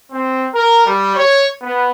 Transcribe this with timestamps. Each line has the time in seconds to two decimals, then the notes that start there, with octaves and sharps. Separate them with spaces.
0.10 C4
0.53 A#4
0.85 G3
1.16 C#5
1.61 B3